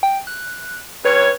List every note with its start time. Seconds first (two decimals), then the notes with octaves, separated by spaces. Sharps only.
0.03 G5
0.27 F#6
1.05 G2 C#4 B4 C#5